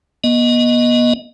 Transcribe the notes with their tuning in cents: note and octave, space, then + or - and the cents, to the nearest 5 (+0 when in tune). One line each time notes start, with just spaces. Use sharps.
B3 -40 D#5 +0